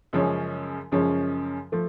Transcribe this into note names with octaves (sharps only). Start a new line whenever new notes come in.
F#2 C#3 F3 G#3 C#4
F#2 C#3 F3 G#3 C#4
F3 A3